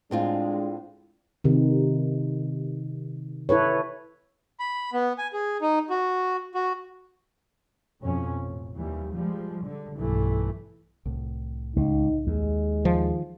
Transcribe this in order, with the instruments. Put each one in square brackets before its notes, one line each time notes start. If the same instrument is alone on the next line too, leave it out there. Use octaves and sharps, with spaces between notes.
[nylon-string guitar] A2 C4 F4 [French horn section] G#3 D4
[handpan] C3 D#3
E4 A4 B4 C#5
[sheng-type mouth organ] B5
B3
G#5
G#4
D#4
F#4
F#4
[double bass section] F2 B2 C#4
A1
D#2 E3 G3
F3 G3 G#3
D3
B1 G2 E3 A3
[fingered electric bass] C2 A2
[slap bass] C#2 [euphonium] D#4
[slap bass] D#2 [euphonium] G#3
[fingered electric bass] D#3 [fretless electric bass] F3